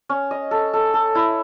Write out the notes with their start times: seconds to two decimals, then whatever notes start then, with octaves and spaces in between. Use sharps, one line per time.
0.09 C#4
0.31 D#5
0.51 A4
0.73 A4
0.94 A4
1.15 E4